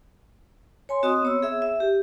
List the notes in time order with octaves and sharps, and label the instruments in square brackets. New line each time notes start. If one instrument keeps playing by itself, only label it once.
[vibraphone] C#5 G#5 C6
C4 F#4 D#5 C6 D#6
B3 C#5 E6
G#4 E5 E6
E5
G4